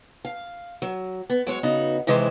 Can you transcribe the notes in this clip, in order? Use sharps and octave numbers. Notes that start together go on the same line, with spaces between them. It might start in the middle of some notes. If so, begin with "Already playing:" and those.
F5
F#3
B3
F#3 G#3 C#5
C#3 B3 D#4 F#4
C3 D#3 E3 G#3 C5